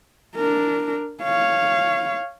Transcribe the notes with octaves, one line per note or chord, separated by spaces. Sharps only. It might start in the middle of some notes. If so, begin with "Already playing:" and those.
D4 A#4
C#5 F5